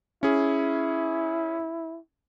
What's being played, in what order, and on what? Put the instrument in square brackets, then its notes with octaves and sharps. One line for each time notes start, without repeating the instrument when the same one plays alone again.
[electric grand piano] C#4 G#4 [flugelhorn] E4